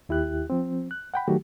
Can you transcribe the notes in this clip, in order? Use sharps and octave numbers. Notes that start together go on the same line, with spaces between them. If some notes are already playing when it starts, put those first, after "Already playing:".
D#2 E4 G4 F#6
F3 C4
F#6
F#5 G5 B5
D#3 F#3 A3 F#4 G4